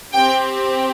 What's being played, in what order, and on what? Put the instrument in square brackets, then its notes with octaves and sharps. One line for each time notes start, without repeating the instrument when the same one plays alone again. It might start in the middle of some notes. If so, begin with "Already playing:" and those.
[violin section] C4 G4 G5